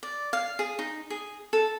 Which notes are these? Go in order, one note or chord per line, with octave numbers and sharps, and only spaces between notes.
D5
F5
G#4
D#4
G#4
A4